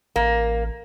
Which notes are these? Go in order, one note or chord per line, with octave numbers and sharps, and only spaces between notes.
A1 A#3